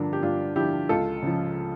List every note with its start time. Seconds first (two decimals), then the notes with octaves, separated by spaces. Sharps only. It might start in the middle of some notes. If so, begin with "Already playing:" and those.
Already playing: G2 D3 F3 A#3 D4
0.13 G4
0.23 G2 D4 F4
0.56 D3 F3 E4 G4
0.89 C#2 F4 A4
1.22 C#3 F3